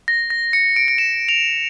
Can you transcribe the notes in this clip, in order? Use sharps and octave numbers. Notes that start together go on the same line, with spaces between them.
A#6
A#6
C#7
D7
D7
E7
F7